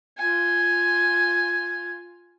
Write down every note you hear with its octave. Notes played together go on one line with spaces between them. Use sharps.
F4 G#5